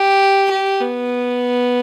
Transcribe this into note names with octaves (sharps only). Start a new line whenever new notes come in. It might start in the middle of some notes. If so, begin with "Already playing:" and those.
Already playing: G4
G4
B3